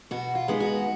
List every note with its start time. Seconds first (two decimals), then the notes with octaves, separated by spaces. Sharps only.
0.11 B2 F#4
0.35 F4
0.48 G#3 B3 D#4
0.60 F#4